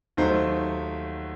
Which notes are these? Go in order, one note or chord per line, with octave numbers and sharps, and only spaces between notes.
D#2 D#3 F#3 A3 C5